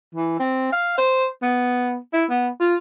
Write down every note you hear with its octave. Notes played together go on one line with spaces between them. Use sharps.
E3
C4
F5
C5
B3
E4
B3
F4